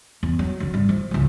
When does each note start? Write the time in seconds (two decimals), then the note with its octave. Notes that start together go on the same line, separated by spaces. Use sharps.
0.23 E2
0.39 F#3
0.60 F#2 D3
0.74 G#1 G3
0.89 F3
1.11 G#1 C#2